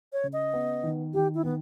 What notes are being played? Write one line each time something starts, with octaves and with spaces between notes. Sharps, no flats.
C#5
C#3
D#5
B3
D#3
D#3 G4
E4
D#3 B3